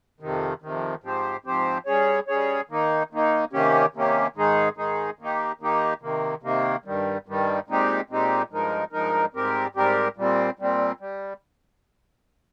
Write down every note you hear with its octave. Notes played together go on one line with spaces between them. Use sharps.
F2 C3 D#3
F2 C3 D#3
G#2 F3 C4 G4 C5
G#2 F3 C4 G4 C5
G3 C#4 G#4 C#5
G3 C#4 G#4 C#5
D#3 A#3 D#4
D#3 A#3 D#4
C3 D#3 A#3 C#4 G4
C3 D#3 A#3 C#4 G4
G#2 D#3 G#3 D#4 G#4
G#2 D#3 G#3 D#4 G#4
D#3 A#3 D#4 G4
D#3 A#3 D#4 G4
C3 D#3 A#3
C3 D#3 A#3
G2 D#3 G3
G2 D#3 G3
A#2 G#3 C4 D#4 G4
A#2 G#3 C4 D#4 G4
G2 F3 G#3 D#4 A#4
G2 F3 G#3 D#4 A#4
G#2 G3 C4 G4 A#4
G#2 G3 C4 G4 A#4
A#2 G3 C4
A#2 G3 C4
G3